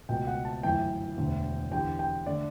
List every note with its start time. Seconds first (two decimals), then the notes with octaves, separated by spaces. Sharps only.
0.09 C#2 B2 A3 G5
0.27 F#5
0.45 A5
0.63 G1 F#2 E3 A3 G5
1.18 E1 D2 D3 A3
1.72 E2 D3 G3 G5
1.99 G5
2.26 D3 A3 D5